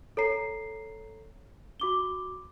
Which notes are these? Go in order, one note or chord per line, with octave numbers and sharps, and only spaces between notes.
A4 C#5 A#5 C7
F#4 D6 G7